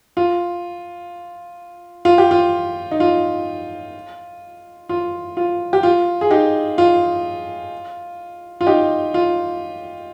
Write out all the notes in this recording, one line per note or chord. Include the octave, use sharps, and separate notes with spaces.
F4
F4
G4
F4
D#4
F4
F4
F4
G4
F4
G#4
D#4 G4
F4
F4
D#4 G4
F4